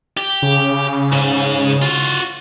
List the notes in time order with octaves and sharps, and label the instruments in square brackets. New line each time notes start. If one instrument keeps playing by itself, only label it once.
[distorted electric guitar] G4
[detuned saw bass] C#3
[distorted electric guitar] G#2 G#4
F4 F#4